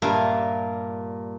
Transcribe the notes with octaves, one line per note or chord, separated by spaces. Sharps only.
G2 A#2 A#3 A#4 E5 F5